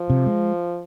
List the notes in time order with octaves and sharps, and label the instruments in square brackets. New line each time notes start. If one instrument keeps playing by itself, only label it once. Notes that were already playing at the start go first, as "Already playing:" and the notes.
Already playing: [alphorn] F3
[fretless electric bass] C3
G#3